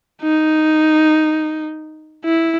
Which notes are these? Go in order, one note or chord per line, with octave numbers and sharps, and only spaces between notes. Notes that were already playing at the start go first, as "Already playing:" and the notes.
D#4
E4